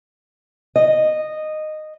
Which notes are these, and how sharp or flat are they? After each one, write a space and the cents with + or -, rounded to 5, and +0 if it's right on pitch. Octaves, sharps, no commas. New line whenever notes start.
D#5 -10